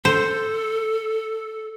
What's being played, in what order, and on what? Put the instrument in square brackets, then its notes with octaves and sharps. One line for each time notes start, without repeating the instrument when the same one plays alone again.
[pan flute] A4 [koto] C5